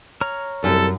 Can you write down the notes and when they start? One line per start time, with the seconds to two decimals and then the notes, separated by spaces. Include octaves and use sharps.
0.21 C#5 A#5 F6
0.64 C2 F#2 A4